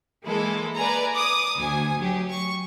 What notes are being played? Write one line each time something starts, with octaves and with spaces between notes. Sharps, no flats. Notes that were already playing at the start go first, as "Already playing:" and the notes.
E3 G#3 A#3 E4 A4
B4 D5 G#5 A#5
D6 D#6
D2 G#5
F#3 G4
C#6